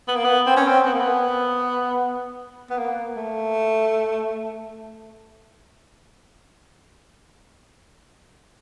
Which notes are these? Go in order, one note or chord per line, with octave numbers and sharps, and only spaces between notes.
B3
A#3
B3
C4
C#4
C4
B3
A#3
B3
B3
A#3
A3